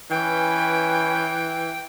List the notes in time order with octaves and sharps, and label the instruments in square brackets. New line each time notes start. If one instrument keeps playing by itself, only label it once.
[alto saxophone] E3 [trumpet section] C#4 B4 [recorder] G5